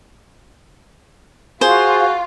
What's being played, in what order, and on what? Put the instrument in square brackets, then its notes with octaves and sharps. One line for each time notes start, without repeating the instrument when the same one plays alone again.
[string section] F4 [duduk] F#4 [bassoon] G#4 [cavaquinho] C5